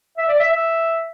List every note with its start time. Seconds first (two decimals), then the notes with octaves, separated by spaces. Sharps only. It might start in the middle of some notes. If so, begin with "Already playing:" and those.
0.18 E5
0.29 D5
0.39 E5
0.51 E5